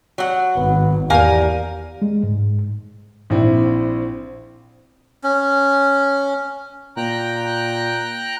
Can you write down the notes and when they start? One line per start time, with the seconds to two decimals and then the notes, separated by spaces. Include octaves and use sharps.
0.18 F#3 F#5
0.57 G#1 B3
1.10 E2 A#3 G4 A#4 D5 F5 G#5
2.02 G#3
2.23 G#2
3.30 A#1 C4 E4
5.24 C#4
6.97 A#2 G5 A#5 F#6